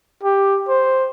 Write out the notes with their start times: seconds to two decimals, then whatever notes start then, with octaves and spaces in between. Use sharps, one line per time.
0.23 G4
0.68 C5